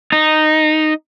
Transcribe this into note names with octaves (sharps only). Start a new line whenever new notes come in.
D#4